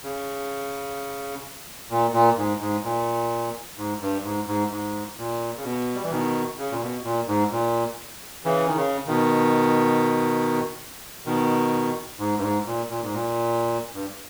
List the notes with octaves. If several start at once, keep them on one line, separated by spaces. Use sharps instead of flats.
C#3
A#2
A#2
G#2
G#2
A#2
G#2
G2
G#2
G#2
G#2
A#2
C#3
B2
G3
E3
B2 D#3
C#3
A#2
B2
A#2
G#2
A#2
C#3 E3
D#3
C#3
B2 D#3
B2 D#3
G#2
G2
G#2
A#2
A#2
G#2
A#2
G2